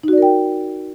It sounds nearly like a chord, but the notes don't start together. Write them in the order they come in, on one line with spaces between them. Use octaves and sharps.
D#4 F#4 D5 A#4 G5